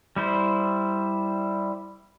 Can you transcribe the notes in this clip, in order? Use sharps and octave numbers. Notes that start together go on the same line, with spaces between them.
G3 E4 C5